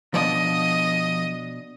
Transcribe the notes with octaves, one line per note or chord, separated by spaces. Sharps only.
B2 F3 B3 D4 D5 D#5